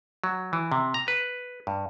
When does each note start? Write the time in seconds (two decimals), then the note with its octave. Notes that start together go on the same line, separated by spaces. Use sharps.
0.24 F#3
0.53 E3
0.72 C3
0.94 A#5
1.08 B4
1.67 G2